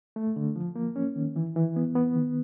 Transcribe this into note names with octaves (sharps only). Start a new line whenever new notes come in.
A3
D3
F3
A#3
C#4
D#3
E3
E3
B3
B3
D#3